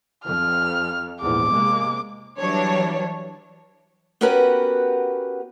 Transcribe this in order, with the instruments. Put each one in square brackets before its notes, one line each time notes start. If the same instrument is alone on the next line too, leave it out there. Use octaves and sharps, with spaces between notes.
[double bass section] F2 [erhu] F6
[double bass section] A#1 E2 G#2 [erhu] D6
[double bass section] C3 G#3 A#3
[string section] E3 F#3 G3 D4 C#5
[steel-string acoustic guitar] B3 C#4 F#4 G4 A#4 B4